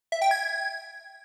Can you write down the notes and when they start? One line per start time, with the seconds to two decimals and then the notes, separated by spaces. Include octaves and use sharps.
0.12 E5
0.22 G5
0.31 G#6